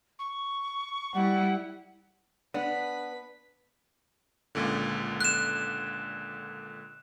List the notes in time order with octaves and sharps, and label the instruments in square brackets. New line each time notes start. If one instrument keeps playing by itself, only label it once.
[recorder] C#6
[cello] G3 E4 [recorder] F#5
[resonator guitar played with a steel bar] B3 [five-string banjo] D4 [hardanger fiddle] B4 B5
[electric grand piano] C#2 A#2 D3
[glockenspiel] F#6 E7